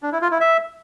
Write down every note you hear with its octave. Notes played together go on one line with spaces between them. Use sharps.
D4
E4
F4
E4
E5